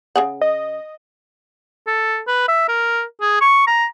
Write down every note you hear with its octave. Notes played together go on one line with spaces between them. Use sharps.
C#3 G#4 F#5
D#5
A4
B4
E5
A#4
G#4
C#6
A#5